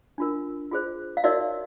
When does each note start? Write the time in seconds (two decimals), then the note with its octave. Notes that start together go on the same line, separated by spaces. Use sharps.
0.18 D4 F4 A#4
0.71 F4 G#4 C5
1.17 F5
1.24 D#4 F#4 A#4 C#5 D5 E5